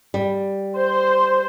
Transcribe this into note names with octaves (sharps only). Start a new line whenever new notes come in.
G3
C5